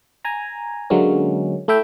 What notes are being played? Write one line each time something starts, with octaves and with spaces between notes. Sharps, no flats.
G#5 A#5
D3 F#3 G#3 A#3 C#4
A3 E4 E5 G5